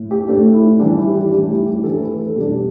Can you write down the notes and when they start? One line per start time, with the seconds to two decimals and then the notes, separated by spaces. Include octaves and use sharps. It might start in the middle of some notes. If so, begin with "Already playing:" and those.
Already playing: A2
0.11 G4
0.28 A2 A3 D4
0.54 E4
0.79 E3 G3 D4 G4
0.97 E4
1.14 G4
1.32 A2 G3 D4 G4
1.49 E4
1.66 G4
1.84 E3 A3 D4 A4
2.01 B4
2.19 A4
2.36 B2 G3 D4 G4